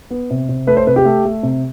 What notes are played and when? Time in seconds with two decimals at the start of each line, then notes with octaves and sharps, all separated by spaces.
0.11 B3
0.30 C3
0.49 C3
0.67 A3 B4
0.77 C5
0.87 C3 B4
0.96 G4
1.05 A3
1.25 A3
1.43 C3